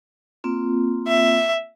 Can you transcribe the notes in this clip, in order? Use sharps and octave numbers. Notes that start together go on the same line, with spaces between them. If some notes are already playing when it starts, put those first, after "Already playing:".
A#3 C4 F4
E5